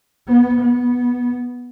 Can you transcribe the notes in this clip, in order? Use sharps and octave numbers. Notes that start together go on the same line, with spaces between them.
B3
B3